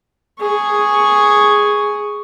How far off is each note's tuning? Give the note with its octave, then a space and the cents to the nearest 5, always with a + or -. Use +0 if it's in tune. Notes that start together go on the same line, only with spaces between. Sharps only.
G#4 +0 C#6 +5